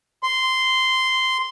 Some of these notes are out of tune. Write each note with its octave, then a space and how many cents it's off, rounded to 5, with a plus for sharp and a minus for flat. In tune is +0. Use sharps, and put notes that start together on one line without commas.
C6 -10